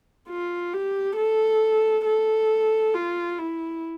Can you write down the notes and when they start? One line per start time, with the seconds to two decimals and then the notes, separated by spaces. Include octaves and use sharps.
0.29 F4
0.73 G4
1.17 A4
2.06 A4
2.94 F4
3.38 E4